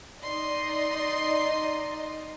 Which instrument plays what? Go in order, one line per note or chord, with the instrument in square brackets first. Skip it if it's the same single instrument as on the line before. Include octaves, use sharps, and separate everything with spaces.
[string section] D#4 D5 D#5 [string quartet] C6